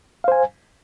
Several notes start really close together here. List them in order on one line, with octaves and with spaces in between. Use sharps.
F5 C5 G#5